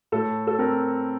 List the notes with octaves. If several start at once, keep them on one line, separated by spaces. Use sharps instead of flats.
A2 A4
A4
C4 A#4